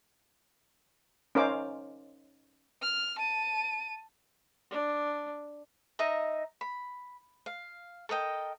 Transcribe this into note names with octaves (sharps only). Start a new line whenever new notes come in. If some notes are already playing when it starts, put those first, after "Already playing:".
C#4 D#4 A#4 C5 F5 D6
F6
A5 D#7
D4
D#4 D#5 E5 A#5
B5
F5
A4 A#4 D#5 G5